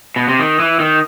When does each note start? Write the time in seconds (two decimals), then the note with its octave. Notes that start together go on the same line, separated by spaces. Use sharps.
0.16 B2
0.28 C3
0.40 D#3
0.59 E3
0.80 D#3